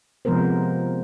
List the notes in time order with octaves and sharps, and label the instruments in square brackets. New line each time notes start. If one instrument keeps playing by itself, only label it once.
[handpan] C3 F3 G#3 B3 A#4 C5